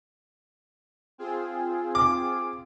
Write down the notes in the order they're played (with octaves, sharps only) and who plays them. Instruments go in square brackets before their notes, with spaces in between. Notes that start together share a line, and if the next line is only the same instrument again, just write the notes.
[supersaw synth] C4 F4 G#4
[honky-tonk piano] D6